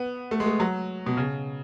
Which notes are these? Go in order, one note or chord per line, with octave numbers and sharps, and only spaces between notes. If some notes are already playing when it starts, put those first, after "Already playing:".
Already playing: B3
A3
G#3
A3
F#3
B2
C#3